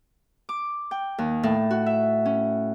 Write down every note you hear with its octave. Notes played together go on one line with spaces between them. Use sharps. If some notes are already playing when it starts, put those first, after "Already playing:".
D6
G5
D#2
A2
F#4
E5
C#4